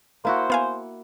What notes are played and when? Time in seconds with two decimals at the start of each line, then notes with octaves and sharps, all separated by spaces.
0.25 A#3 E4 F#4 C5
0.50 B3 F5 G#5